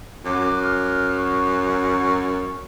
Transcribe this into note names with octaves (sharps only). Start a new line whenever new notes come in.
F#2 D6
F6
C#6